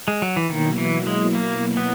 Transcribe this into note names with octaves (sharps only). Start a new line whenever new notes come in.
G#3
F#3
E3
B2 D#3 F#3 A#3 E4
E3
G#3
A#3
B3